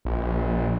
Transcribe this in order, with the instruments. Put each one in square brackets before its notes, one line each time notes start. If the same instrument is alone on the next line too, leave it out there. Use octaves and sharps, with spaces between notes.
[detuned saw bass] A#1